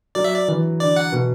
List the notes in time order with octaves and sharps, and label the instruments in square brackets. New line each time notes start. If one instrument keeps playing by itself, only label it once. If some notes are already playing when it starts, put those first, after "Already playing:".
[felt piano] F#3 [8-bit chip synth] D5
[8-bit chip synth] E5
D5
[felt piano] E3
[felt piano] D3 [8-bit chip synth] D5
[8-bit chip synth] F#5
[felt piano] B2